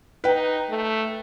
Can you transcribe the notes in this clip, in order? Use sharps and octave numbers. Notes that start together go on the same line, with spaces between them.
D#4 B4 G5
A3